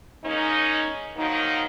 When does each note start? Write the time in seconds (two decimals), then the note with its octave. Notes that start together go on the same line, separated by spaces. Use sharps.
0.24 G#3 A#3 C#4 D#4
1.17 D#3 F3 F#3 A#3 D#4